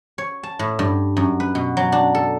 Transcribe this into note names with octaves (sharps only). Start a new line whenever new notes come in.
C#5
A5
A2
G2
F#2
B4
B2
F#3
D4
A4